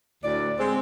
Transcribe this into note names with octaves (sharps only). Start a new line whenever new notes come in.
D2 A2 D5
G#3 C4